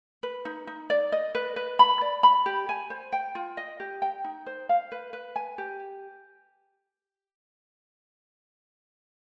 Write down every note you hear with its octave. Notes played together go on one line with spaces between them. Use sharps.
B4
D#4
D#4
D5
D#5
B4
B4
B5
D5
B5
G4
G#5
C5
G5
F4
D#5
G4
G5
D#4
C5
F5
B4
B4
G#5
G4